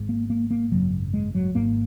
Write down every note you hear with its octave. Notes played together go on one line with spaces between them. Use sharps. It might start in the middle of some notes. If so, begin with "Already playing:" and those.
Already playing: G#1 G#2
A#3
A#3
A#3
G#1 F#2 C#3 F#3
G#3
F#3
G#1 G#2 A#3